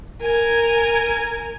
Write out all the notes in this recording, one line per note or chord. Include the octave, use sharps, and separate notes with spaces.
A#4 G#5